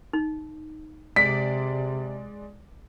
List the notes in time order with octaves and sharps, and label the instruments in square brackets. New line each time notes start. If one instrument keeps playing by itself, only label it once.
[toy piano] D#4
[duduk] C3 [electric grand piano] G#3 D5 D7 [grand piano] B6